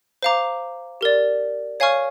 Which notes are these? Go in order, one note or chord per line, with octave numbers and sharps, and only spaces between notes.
C5 F5 A#5 D6
G4 A#4 D5
C#5 F5 G#5 C#6 F6